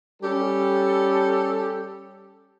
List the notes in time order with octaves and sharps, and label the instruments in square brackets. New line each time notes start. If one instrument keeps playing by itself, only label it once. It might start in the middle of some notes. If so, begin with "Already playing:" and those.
[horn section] G3 C#4 G4 A4